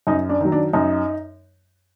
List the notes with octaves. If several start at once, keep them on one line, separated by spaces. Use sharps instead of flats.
F#2 D#4
D4
D#3 F#3
D4
F#2 D#4